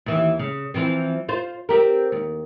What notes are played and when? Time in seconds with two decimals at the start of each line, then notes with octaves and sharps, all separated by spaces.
0.06 D#2 E3
0.39 C#3
0.74 E3 F3 C4
1.29 F4 C5
1.69 C4 G4 A#4
2.12 D#2